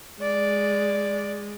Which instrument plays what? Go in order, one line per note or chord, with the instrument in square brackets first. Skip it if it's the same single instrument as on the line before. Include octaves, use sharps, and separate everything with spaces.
[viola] G#3 [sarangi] D5